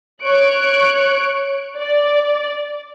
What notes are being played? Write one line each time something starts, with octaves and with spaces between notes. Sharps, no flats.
C#5 C#6 F#6 D7
D5